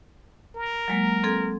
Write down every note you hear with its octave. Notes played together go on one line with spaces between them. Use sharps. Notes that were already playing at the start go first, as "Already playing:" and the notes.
A#4
F#3 G#3 A#3
C4 A4 G#6